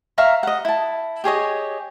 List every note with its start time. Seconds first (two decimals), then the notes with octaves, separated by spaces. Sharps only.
0.18 E5 F5 A#5 C#6
0.43 D#5 F#5
0.65 E4 A5
1.24 G4 G#4 C#5 D#5